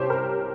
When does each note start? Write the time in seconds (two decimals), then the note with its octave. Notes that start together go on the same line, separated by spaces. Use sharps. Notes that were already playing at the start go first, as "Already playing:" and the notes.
Already playing: C2 C3 G4 C5 C#5
0.10 A#4